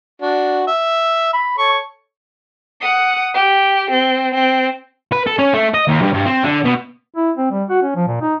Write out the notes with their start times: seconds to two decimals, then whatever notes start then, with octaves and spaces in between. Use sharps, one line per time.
0.22 D4 F#4
0.67 E5
1.33 B5
1.58 A4 C#5 C#6
2.81 F#5 D#6
3.34 G4
3.90 C4
4.35 C4
5.13 B4
5.27 A4
5.39 C#4
5.54 A3
5.74 D#5
5.88 D#2
6.01 G2
6.13 G2
6.25 C4
6.43 D3
6.65 B2
7.16 E4
7.37 C4
7.51 G3
7.70 F#4
7.83 C#4
7.95 F3
8.07 A#2
8.21 D#4